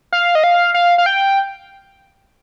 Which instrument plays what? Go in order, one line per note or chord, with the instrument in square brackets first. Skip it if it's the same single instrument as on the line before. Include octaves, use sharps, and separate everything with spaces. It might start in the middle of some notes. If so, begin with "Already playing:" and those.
[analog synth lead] F5
D#5
F5
F5
F5
G5